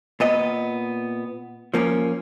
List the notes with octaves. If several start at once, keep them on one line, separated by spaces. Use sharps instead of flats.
A#2 B3 D#5
F3 A#3 C#4